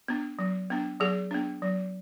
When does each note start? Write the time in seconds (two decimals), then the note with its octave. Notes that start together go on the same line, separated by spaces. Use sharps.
0.08 B3 D4
0.39 F#3
0.70 B3 D4
1.00 F#3 G#4
1.31 B3 D4
1.62 F#3